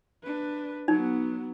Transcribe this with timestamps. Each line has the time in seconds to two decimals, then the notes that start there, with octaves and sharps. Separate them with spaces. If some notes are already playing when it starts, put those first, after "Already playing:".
0.23 D4 B4
0.88 F#3 B3 D#4